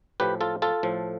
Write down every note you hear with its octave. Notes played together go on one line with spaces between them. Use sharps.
A2 F3 G4 B4
F4 A4
F4 A4
A2 F3